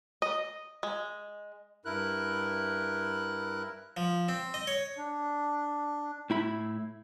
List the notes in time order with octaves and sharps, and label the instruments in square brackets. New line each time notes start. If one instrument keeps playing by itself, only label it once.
[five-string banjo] D#5
G#3
[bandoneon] G2 E4 A#4 F#6
[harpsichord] F3
C4
D#5
C#5
[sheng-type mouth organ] D4
[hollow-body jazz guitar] A2 E4 B5